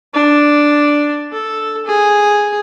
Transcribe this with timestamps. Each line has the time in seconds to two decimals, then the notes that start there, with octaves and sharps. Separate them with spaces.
0.14 D4
1.32 A4
1.86 G#4